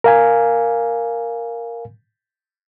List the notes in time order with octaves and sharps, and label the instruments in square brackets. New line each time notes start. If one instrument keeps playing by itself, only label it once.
[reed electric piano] A#4 F5 G#5